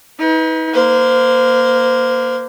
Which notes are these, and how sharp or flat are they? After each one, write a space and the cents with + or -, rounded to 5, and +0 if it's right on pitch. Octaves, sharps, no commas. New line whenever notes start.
D#4 +45 B4 +5
A#3 +10 C5 -25